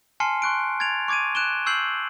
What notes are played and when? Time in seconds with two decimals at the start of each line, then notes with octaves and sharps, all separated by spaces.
0.20 G#5 A5 C6 F6 C7 C#7
0.42 C6 C#6 F#6 D7
0.80 G#6 A6 D7 F7
1.08 C#6 D6 G#6 D7 D#7
1.35 F#6 D7 E7 G7
1.66 C#6 E6 G6 C7 F#7